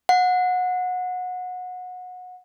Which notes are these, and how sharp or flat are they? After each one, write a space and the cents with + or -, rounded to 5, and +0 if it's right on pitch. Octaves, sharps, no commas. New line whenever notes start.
F#5 -25